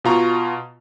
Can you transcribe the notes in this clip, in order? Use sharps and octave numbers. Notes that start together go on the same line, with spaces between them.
B2 F4 A#5 C#6